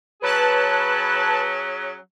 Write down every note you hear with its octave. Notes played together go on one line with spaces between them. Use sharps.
F#3 C#4 G#4 B4 A5 F#6